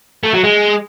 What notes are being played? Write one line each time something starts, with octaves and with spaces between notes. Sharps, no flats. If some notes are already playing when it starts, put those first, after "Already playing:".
A3
F#3
G#3